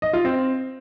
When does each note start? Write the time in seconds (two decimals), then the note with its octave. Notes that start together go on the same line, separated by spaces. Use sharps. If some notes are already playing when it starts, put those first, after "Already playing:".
0.02 D#5
0.13 F4
0.25 C4